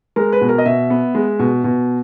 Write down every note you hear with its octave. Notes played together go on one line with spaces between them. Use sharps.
G#3 A#4
B4
B2
A#4
D#5
B2 E5
B3
G#3
B2
B2